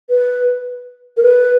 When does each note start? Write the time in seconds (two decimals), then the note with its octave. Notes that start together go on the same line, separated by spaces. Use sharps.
0.10 B4
1.17 A#4
1.23 B4